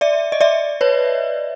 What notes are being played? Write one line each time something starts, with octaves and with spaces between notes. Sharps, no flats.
D5 E5
D#5
D5 E5
B4 C#5